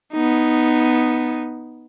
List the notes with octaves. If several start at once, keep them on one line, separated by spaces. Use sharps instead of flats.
B3 D#4